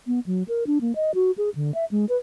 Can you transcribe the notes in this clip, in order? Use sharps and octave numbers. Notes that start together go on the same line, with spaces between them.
B3
F#3
A#4
D4
A#3
D#5
F#4
G#4
D3
E5
G#3
B4